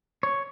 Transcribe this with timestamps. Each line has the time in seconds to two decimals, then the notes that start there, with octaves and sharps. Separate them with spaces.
0.23 C#5